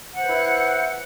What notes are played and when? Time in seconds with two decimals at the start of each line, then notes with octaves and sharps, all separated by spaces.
0.14 F#5
0.19 C5
0.24 B4
0.29 E4